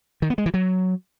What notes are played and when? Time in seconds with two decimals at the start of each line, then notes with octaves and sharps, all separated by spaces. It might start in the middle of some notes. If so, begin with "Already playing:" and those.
0.22 D#3
0.30 B3
0.38 G#3
0.46 E3
0.54 F#3